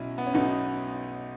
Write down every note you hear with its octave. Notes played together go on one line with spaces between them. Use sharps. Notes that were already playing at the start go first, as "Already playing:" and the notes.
Already playing: B1 B2 C#4 E4
B3
C#4
B1 B2 B3 D#4